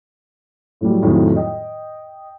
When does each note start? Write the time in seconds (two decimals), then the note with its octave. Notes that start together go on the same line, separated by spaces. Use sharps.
0.81 A2 F#3 G3
1.02 F2 A2 D#3 F#3 G3
1.36 D#5 G5